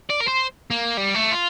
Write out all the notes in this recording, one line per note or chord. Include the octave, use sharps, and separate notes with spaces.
D5
A#4
C5
A#3
G3
A3
F4